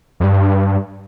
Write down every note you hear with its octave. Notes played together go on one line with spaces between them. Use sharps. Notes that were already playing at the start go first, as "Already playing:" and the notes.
F2
G2